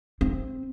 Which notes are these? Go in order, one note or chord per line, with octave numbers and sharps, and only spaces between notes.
C4